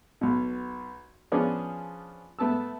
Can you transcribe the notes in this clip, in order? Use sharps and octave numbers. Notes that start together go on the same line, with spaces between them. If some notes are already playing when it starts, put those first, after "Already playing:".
B1 B2
F3 B3 C#4 D4 G#4 D5
A3 B3 A5 E6